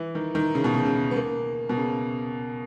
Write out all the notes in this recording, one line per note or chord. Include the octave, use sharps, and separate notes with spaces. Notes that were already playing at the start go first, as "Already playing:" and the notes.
Already playing: E3
D#3
D#3
C#3
B2
C#3
C#3
B3
A#3
B2
C#3